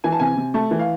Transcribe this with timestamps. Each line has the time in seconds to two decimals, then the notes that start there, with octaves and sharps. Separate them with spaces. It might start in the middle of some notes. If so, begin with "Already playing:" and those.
0.04 E3 G#5
0.12 A5
0.19 C3 G#5
0.37 C3
0.54 A3 A5
0.71 E3
0.79 F5